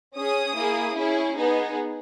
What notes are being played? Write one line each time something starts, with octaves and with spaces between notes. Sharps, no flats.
C#4 G#4 D#6
A#3 E4 G#4
C#4 E4 G#4
B3 D#4 G#4